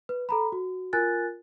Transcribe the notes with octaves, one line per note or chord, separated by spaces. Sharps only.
B4
A4 A#5 B5
F#4
F4 A#4 G#5 F#6 A6